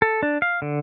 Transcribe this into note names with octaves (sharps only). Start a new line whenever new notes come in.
A4
D4
F5
D3